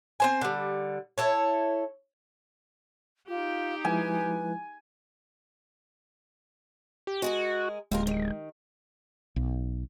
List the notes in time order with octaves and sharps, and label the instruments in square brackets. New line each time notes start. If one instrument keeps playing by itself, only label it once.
[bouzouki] C4 C5 G#5
D3 G3
E4 A4 C#5
[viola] D#4 G4 [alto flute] F4
[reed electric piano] F3 G#3 E4 [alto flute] B4 [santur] G#5
[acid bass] G4
[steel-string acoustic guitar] G#3 G#4 A#4 [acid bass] F#4
[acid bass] D1 [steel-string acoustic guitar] D#2 F4 A#4 [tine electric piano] G#3
[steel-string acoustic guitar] D#3
[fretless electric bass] B1